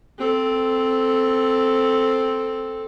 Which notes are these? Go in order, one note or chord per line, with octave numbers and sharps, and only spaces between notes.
C4 A4